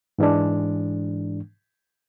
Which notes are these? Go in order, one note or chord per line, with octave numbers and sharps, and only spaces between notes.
G#2 E3 G#3 D4